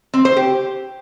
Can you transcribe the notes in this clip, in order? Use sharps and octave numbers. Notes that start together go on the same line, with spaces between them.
C4
C5
G4